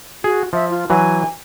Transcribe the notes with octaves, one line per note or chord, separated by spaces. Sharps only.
F#4 G#4
F3 E5
F4
E3 F#3 G#5